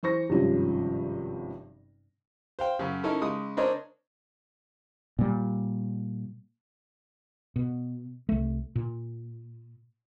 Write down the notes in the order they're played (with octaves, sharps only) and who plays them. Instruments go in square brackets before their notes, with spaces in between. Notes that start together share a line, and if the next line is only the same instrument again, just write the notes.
[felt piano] E3 C5 C#6 A#6
G#1 G2 C3 F3 C#4
[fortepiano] C5 F5 G5
F#2 C#3
C#4 D#4 E4 A4 A#4
C#3 G#3 D#6
C4 D4 A#4 C5 C#5 D#5
[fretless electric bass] A#2 G3
B2
C2 A3
A#2